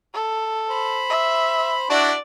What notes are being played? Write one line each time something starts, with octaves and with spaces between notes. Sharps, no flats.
A4
C5 B5
E5
D4 E4 F#4 D5